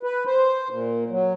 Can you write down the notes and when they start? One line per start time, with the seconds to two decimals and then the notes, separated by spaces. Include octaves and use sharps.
0.03 B4
0.26 C5
0.69 A#2
1.10 F#3